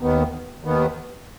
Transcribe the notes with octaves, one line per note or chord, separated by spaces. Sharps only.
D#2 D#3 B3
D#2 D#3 B3